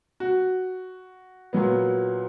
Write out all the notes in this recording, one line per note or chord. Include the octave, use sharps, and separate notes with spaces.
F#4
A#2 F#3 B3